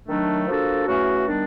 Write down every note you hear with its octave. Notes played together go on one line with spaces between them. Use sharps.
D#3 F#3 A3 D4
F3 A#3 D4 F#4 A4
C#3 E3 A3 C#4 F#4
D#3 G3 B3 D4